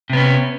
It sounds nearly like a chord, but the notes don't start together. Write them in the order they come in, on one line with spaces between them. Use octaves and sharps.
C3 B3 C#4